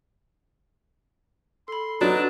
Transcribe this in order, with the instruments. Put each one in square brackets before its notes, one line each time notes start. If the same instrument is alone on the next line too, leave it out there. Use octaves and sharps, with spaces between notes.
[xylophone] A4 B5 [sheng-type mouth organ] C6
[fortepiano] F#3 [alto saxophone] D4 [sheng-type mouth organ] D#4 [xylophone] B4 D#6